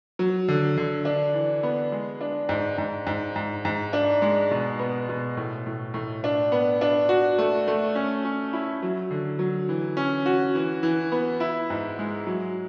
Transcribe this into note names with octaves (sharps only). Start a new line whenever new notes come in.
F#3
D3
D3
D4
E3
B3
G#3
D4
G#2
G#2
G#2
G#2
G#2
D4
G#3
B2
B3
B2
A2
A2
A2
D4
B3
D4
F#4
A3
A3
C#4
C#4
E4
F#3
D3
F#3
E3
C#4
F#4
E3
E3
B3
E4
G#2
G#3
F#3